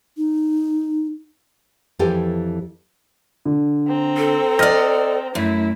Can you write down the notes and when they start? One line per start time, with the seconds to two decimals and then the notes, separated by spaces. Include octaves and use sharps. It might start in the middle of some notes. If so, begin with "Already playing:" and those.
0.17 D#4
1.99 F2 E3 G4 A4 G5 G#5
3.45 D3
3.87 C4 A#5
4.17 A4
4.59 D5 D#5 F6 A#6
5.35 F#2 A3 E4